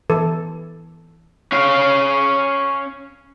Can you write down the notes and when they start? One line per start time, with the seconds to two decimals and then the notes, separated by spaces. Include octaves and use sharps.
0.10 E3 A4
1.52 C#4 F5